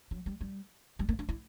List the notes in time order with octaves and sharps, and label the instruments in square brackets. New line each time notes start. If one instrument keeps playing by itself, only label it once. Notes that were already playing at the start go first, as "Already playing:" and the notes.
[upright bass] F#3
G3
G3
G3
A#3
D4
E4